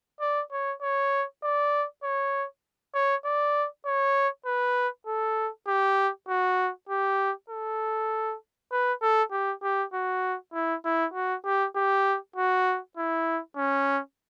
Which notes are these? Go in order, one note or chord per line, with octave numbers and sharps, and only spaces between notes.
D5
C#5
C#5
D5
C#5
C#5
D5
C#5
B4
A4
G4
F#4
G4
A4
B4
A4
G4
G4
F#4
E4
E4
F#4
G4
G4
F#4
E4
C#4